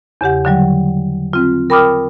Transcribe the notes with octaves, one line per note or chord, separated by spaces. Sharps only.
E2 C#3 G4 F#5
D3 F#3 G3
C4 F4
A#4 G5 B5 D6 D#6 F6